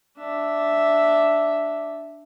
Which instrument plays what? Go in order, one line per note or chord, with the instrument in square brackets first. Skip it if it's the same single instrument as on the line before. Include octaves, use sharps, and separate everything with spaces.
[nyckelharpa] D4 E5